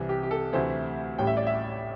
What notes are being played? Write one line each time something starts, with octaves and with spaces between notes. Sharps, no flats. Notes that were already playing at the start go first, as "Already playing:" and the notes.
Already playing: C2 C3 E3
G4
G4
A4
D2 C3 E3 A3 C5
A1 A2 G3 G5
E5
D5
E5